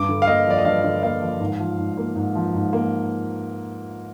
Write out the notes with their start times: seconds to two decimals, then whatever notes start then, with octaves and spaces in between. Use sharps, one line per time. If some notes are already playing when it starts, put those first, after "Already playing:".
Already playing: G2 D6
0.09 D3
0.22 F5
0.27 A#3 D#5
0.46 F3 D5
0.58 D#5
0.65 G2 F5
0.84 D3
1.03 A#3 F5
1.22 F3
1.40 G#2
1.60 F3
1.78 G#2
1.97 A#3
2.16 G#2
2.35 F3
2.55 G#2
2.73 A#3